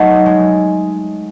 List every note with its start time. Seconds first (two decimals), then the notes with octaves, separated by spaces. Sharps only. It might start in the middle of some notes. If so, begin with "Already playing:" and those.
Already playing: F#3 A3 D#4 A4
0.26 G#3